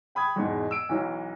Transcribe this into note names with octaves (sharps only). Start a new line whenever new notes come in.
G5 B5 D#6 G#6
E2 G#2 B2
E6 D7
B1 E3 F#3